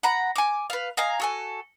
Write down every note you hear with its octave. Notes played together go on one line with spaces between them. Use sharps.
F#5 A#5 B5
G#5 D6
B4 F5
D#5 F5 G#5 A#5
F#4 A4 G#5